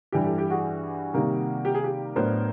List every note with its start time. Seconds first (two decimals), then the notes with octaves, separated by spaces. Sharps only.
0.12 G2 E3 G3 G4
0.24 G4 A4
0.38 G4
0.50 F#4 G#4
1.14 C3 D#3 G3 A#3
1.65 G4
1.75 G#4
1.84 G4
2.16 A2 F#3 B3 D4 A#4 C5